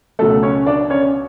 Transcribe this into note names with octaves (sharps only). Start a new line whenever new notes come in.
C#2 B2 F#3 A3 A4
C#4 C#5
D4 D5
C#4 C#5